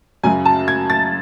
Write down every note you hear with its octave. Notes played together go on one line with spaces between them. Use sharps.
F#2 C#3 F#3 G#5
A5
G#6
A6